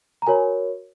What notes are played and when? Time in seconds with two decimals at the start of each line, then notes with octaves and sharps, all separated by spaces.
0.22 A#5
0.27 F#4 A#4 C#5 G#5